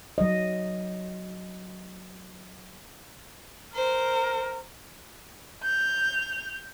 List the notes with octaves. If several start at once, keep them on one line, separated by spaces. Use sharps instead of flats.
F#3 D#5
A#4 C5
G6 F7